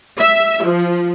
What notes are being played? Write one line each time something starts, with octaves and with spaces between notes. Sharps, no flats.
E5
F3